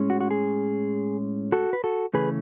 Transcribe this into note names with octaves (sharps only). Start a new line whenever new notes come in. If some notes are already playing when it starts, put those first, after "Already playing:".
Already playing: A2 G#3 C#4
F#4
F#4
G#4
F#4 A4
B4
F#4 A4
C#3 E3 A3 C#4 G#4 B4